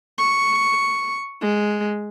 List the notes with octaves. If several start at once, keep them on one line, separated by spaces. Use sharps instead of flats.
C#6
G#3